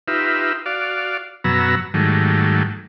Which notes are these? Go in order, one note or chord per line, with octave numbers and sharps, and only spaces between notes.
D#4 F4 G4 B4 E5
F#4 D5 F5
F#2 B2 F#3 B3 A#5 E6
G#2 D#3 F#3 G3 A3